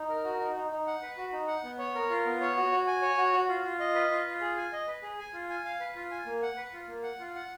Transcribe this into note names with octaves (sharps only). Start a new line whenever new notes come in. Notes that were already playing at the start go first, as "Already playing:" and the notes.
Already playing: D#4
A#4
F#4
D#4
D#4
D#4
F#5
B4
F#4
D#4
F#5
B3
C#5
A#4
F4
B3
C#5
F#4
F#4
G#5
C#5
F#4
F#4
F4
F4
D#5
B4
F4
F4
G#4
G#5
D#5
B4
G#4
G#5
F4
G#5
F5
B4
F4
G#5
A#3
F#5
B4
F4
A#3
F#5
F4
F#5